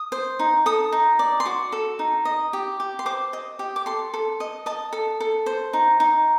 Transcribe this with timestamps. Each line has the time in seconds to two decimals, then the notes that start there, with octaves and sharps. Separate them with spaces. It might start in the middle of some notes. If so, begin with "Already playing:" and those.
Already playing: D#6
0.12 C5
0.39 D#4
0.66 A4 D#6
0.92 D#4
1.19 D5
1.40 C6
1.45 F#4 D6
1.72 A4
1.99 D#4
2.25 D#5
2.53 G4
2.80 G4
2.99 C6
3.06 C5 D6
3.33 D#5
3.59 G4
3.76 D6
3.86 A4 C6
4.14 A4
4.40 D#5
4.66 D#5 A5
4.93 A4
5.20 A4
5.46 C5
5.73 D#4
6.00 D#4